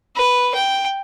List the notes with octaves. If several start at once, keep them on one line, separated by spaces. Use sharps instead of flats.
B4
G5